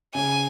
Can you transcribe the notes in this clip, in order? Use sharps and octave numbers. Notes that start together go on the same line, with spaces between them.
C#3 G#5